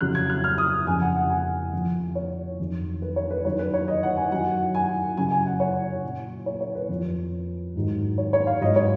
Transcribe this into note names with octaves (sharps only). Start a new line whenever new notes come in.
F2 C#3 F#3 F#6
G#6
F#6
F6
D#6
F2 C#3 F3 G#5
F#5
F#5
G#5
F2 F3
C#5
F2 D#3 F#3
B4
C#5
B4
F#2 D#3 F#3 C#5
B4
C#5
D#5
F#5
G#5
F#2 D#3 F#3 F#5
G#5
F#2 C#3 F#3 G#5
G#5
F#5
C#5
A#2 F#3
C#5
C#5
B4
F2 F3
G#2 D#3 F#3
C#5
C#5
F5
G#2 F#3 D#5
C#5